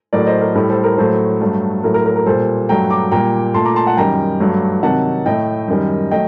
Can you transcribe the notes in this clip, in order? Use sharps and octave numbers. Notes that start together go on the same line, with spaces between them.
A2 F#3 A3 A#4 D5
C5 D#5
A#4
A2 G3 A4
A4 C5
A#4
A2 F#3 A3 A4 C5
G2 F#3 A3
A2 F#3 A3 A#4
A#4
A#4
A#4
A#2 G3 A4 C5
G2 F#3 A3 G5 A#5
A#5 D6
A#2 G3 G5 A#5
A#2 A3 A5 C6
A#5 D6
A5 C6
F#5 A5
F#2 D#3 G3 G5 A#5
G2 F#3 A3
C3 D#3 F#3 F#5 A5
A2 A3 D#5 G5
F#2 D#3 G3
F#3 A3 D#5 G5